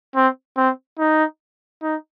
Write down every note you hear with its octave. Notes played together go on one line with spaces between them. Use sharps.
C4
C4
D#4
D#4